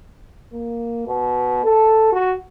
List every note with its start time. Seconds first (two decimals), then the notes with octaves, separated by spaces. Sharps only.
0.53 A#3
1.07 B2
1.64 A4
2.12 F#4